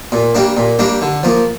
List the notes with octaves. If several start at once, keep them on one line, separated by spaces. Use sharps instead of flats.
A#2
G3 A#3 D4
A#2
G3 A#3 D4
D3
F3 A#3